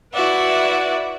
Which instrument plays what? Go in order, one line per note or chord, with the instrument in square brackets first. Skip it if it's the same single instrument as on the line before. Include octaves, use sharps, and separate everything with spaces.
[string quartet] E4 F#4 B4 D5 E5 F#5